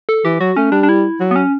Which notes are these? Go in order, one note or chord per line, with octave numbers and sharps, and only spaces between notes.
A4
E3 G4
F#3 F#4
A3 C#4
G3 D4
D4
E4
F#3
B3
C#4